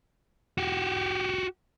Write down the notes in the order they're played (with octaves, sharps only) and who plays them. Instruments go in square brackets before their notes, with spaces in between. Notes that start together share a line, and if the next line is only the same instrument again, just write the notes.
[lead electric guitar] F#4 G4